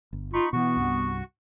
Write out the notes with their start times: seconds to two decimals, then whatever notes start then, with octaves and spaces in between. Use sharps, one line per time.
0.13 G1
0.33 D#4 F4 B5 C#6
0.53 B2 E3 B3 F#4 C#6
0.77 C2 G2